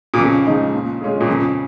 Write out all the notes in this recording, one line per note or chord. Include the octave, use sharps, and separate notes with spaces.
A#2
F2 C#3
F3 G#3 D#4
A#2
G#3 C#4 F4 G#4
A#2
F2 C#3